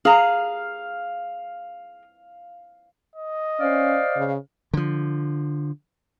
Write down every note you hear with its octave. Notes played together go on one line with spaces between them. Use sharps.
G#4 F5 A#5
D#5
C#4 C5 D5 F5
C#3
D3 F3